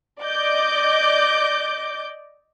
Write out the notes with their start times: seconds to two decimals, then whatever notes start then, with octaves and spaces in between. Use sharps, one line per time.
0.21 D5 D#5 D6 G6